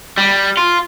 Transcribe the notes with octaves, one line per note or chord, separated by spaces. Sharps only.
G3
F4